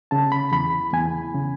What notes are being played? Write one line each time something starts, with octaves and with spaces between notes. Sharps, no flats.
C#3 A5
B5
E2 B5
E2 G#5
C#3